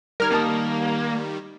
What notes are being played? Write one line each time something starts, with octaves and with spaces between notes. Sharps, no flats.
D#3 G3 A#4 F6 G#6
A#3 D#4 A5 D#6